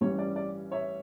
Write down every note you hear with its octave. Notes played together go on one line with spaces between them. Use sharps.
A1 G2 E3 G3 C#4 C#5
D5
D5
C#5 E5